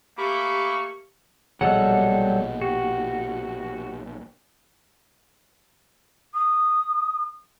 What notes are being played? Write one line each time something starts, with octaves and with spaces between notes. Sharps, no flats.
A3 A#3 G4 B5 C#6 D6
A#1 B2 F#3 G3 G#4 A4 D#5 F#5
F#4 G4
D#6